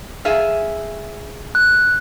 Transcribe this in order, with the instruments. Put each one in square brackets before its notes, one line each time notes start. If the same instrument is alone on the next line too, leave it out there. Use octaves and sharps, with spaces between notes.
[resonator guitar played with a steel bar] G#4 E5 F5
[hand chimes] F#6